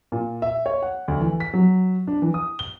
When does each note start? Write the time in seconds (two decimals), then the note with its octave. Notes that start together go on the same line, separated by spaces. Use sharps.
0.12 A#2
0.42 E5
0.66 C#5
0.82 F#5
1.08 D2
1.20 E3
1.40 B6
1.54 F#3
2.07 D4
2.22 E3
2.34 D#6
2.59 G7